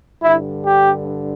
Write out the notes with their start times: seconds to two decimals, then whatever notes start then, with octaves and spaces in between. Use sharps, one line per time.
0.23 G2 D3 E4
0.65 G4